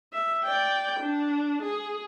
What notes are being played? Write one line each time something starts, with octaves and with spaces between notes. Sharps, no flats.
E5
D5 G5
D4
G#4